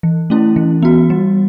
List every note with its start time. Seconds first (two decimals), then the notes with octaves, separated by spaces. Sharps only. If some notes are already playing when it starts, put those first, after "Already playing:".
0.03 E3
0.30 A3 C#4 E4
0.56 E3
0.82 B3 F#4
1.10 G3